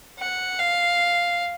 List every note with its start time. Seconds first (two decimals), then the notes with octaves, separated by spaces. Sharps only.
0.19 F#5
0.59 F5